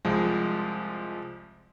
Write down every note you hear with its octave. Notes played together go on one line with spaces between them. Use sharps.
C2 F3 G#3